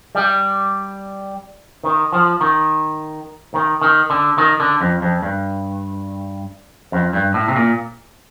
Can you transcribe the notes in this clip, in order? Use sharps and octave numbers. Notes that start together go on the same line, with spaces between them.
G3
D#3
F3
D#3
D#3
D#3
D3
D#3
D3
F2
F2
G2
F2
G2
A2
C3
A#2